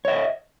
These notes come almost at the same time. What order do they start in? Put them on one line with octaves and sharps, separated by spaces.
C#5 E5 D#5